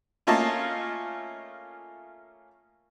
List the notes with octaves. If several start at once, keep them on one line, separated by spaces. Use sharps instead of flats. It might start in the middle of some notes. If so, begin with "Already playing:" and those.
A3 A#3 C#4 F4 D#5 A5